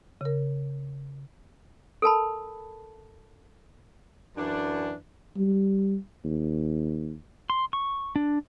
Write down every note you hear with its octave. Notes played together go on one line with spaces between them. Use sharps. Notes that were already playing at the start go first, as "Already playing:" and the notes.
C#3 A#4
A4 A#4 A5 B5
F#2 E3 D4
G3
D#2
C6
C#6
D4